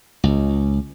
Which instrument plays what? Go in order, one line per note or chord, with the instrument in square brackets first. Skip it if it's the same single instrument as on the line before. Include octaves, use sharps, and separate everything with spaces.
[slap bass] C#2